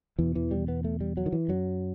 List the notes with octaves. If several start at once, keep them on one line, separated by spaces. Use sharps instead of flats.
E2 B2 E3
E3
G3
B3
A3
G3
F#3
D#3
E3
F#2 F#3